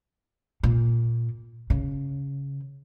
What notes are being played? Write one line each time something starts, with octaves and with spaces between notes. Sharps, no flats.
A#2
C#3